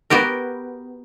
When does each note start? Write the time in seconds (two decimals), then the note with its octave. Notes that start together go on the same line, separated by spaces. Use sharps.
0.10 B3 F#4 G4 A#4